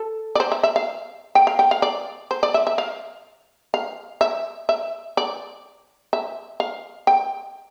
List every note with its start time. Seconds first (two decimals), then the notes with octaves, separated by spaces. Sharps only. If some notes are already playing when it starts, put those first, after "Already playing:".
Already playing: A4
0.35 D5
0.40 C5
0.52 E5
0.63 E5
0.76 F5
1.35 G5
1.47 F5
1.59 G5
1.71 F5
1.82 D5
2.31 C5
2.43 D5
2.54 E5
2.67 E5
2.78 F5
3.74 F5
4.21 E5
4.69 E5
5.17 D5
6.13 E5
6.60 F5
7.07 G5